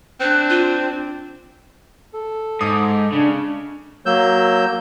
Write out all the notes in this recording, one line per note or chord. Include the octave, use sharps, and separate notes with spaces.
C4 D4 F#6
F4
A4
G#2 D6 D#6
C#3 D4
F#3 A#3 E6 G6